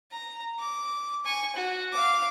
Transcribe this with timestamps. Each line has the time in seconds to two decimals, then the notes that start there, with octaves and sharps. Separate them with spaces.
0.11 A#5
0.59 D6
1.25 G#5 C#6
1.56 F#4
1.92 F5 D6